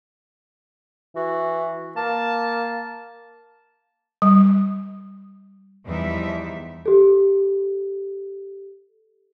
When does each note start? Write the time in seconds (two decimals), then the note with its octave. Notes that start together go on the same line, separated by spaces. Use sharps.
1.16 E3 F#4
1.97 A#3 A5
4.22 G3
5.86 E2 E3 F3 G3 D#4 E5
6.86 G4 A4